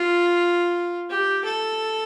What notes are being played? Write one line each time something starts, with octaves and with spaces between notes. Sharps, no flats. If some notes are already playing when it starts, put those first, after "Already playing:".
Already playing: F4
G4
A4